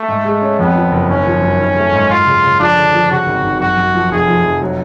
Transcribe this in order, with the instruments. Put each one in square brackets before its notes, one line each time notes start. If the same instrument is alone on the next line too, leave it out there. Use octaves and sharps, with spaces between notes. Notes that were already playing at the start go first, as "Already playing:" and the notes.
Already playing: [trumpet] A3
[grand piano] G#2
G#3
C#4
[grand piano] F2 [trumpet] B3
[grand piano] F3
F#1
[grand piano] G#1 [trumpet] C#4
[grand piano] F3
F#2
G#1
A3
G#2
[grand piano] F#2 [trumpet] F4
[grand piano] C#3
C#3
[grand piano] F3 [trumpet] D4
[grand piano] D3
F3
[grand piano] C#3 [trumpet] F#4
[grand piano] G#1
G#1
[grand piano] F#2 [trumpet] F#4
[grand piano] F#2
F3
[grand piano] F1 [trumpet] G#4
[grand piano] F3
F1
F#3